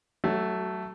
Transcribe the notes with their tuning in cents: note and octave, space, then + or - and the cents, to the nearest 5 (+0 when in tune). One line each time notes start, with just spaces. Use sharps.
F#3 +25 A3 +0